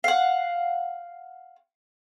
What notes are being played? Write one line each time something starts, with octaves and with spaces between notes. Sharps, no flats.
F5 F#5